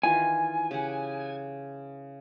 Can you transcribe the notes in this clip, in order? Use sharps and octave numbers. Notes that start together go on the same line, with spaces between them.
D#3 E3 F4 G#5
C#3 G4 F#5